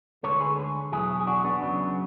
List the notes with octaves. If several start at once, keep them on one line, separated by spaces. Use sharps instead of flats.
D2 D3 G#3 A4 C#5
G#4 B4
E2 B2 F#3 E4 G#4
G#4
D4 F#4
B3 D4
F#2 C#3 F#3